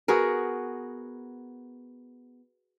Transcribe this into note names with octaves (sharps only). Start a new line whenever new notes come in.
B3 F#4 G#4 A#4